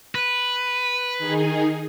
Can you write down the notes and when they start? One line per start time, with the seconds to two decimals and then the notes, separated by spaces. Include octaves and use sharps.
0.15 B4
1.19 D#3 D#4 G#4